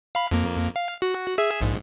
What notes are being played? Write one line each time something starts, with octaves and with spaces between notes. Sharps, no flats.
F5 B5
F2 A#3
F5
F#4
G#4 E5 E6
A#1 G#2